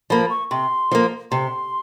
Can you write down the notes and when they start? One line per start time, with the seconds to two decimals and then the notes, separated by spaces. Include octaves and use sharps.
0.10 F3 A#3 B5
0.30 C#6
0.51 C3 C6
0.91 F3 A#3
1.31 C3 C6